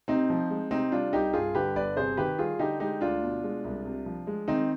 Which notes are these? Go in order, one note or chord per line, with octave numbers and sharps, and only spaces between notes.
C3 C4 D#4
F3
G#3
C3 C4 D#4
G3 D4 F4
C2 D#4 G4
G2 F4 G#4
D3 G4 B4
G1 B4 D5
C3 G#4 C5
D#3 G4 B4
G3 F4 G#4
D3 D#4 G4
G#3 D#4 G4
D2 D4 F4
B2
G#3
C2
C3
F3
G#3
D#3 C4 D#4